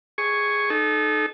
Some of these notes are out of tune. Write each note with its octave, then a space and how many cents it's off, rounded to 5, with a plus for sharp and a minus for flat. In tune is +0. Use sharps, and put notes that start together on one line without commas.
G#4 +0 C#6 +0
D#4 -25 A4 -30